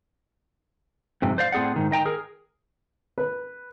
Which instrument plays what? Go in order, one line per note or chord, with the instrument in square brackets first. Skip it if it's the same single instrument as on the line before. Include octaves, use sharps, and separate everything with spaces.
[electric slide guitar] F2 G#2 C3
C5 D5 F5
A2 C4 G#4 D5 F#5
G#2 D#3
D#3 D#5 G5 A#5
G#4 A#4
[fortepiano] B4